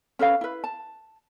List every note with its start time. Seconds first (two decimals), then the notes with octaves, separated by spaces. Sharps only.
0.19 C#4 A4 B4 F5
0.41 E4 B4
0.64 A5